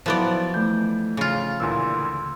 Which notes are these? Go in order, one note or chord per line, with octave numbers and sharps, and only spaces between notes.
F3 F#3 B3 E4 C5 D5
E3 A3 G6
C#3 F4
D2 A#2 E3 C6 E6